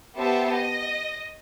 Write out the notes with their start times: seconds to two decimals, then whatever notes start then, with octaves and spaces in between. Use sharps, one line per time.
0.16 B3 G4 C5 E5 A5
0.53 D#5